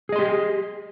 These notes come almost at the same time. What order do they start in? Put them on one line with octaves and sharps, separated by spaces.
G#4 D#5 C6 G4